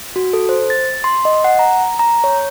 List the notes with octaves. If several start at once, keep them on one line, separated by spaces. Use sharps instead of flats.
F#4
A4
C5
A6
C6
D#5
F#5
A#5
A#5
C#5